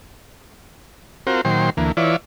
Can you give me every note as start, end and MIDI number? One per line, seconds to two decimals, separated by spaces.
1.27 1.41 60
1.27 1.41 65
1.27 1.41 66
1.27 1.41 70
1.27 1.41 72
1.45 1.70 46
1.45 1.70 51
1.45 1.70 54
1.45 1.70 72
1.45 1.70 79
1.45 1.70 84
1.77 1.92 38
1.77 1.92 52
1.77 1.92 58
1.97 2.16 52
1.97 2.16 64
1.97 2.16 65
1.97 2.16 71
1.97 2.16 73
1.97 2.16 74